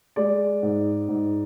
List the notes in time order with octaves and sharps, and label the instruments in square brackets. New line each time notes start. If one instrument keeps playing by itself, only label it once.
[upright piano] G#3 D5
G#2
G#2